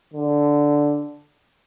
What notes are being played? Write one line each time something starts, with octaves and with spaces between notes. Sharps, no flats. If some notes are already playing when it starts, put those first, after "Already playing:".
D3